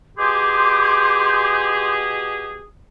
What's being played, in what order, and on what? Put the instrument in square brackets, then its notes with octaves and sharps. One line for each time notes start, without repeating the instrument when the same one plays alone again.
[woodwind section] B2 G4 G#4 [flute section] C6 D6 G6